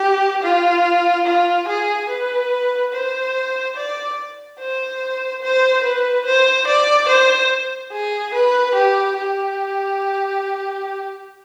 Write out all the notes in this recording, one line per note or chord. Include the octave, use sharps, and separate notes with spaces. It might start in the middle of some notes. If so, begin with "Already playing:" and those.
Already playing: G4
F4
F4
G#4
B4
C5
D5
C5
C5
B4
C5
D5
C5
G#4
B4
G4
G4